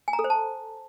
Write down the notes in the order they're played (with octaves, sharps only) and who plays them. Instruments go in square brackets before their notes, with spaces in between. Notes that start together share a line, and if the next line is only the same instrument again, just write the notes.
[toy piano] G#5
A#5
A4
C5
A5